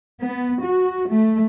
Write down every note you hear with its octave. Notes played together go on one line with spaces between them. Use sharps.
B3
F#4
A3